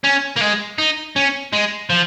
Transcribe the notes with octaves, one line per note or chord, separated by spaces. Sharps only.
C#4
A#3
G#3
D#4
C#4
G#3
F3